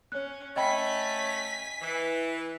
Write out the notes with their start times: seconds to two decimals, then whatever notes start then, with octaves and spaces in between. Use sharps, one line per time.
0.12 C#4 C#5 F#6
0.56 A3 C#4 D#5 G5 G#5 B5 B6
1.81 E3